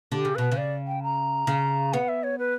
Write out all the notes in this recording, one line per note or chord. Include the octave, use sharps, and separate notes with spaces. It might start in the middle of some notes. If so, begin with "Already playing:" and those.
D3 G4
C#3
B2 B4
C#3
D5
G5
A#5
C#3
B3 F#5
E5
C#5
B4